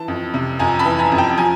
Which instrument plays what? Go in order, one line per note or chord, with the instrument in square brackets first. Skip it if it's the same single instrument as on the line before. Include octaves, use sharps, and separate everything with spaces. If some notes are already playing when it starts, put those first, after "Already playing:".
Already playing: [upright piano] E3 A5
F2
C3
F2 G#5 A#5
A5 B5
E3
G#5 A#5
F2
G5 A5
F3 G#5 A#5